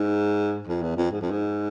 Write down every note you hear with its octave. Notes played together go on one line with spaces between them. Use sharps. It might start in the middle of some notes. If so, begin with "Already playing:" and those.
Already playing: G#2
F2
E2
F2
G#2
F2
G#2